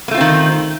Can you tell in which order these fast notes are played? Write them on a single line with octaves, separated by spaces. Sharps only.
A#3 A3 F4 C4 D#3